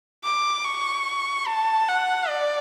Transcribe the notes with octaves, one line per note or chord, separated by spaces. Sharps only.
D6
C#6
A5
F#5
D5